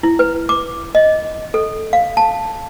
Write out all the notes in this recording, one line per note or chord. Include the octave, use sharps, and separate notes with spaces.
E4
B4
D6
D#5
A4
F5
A5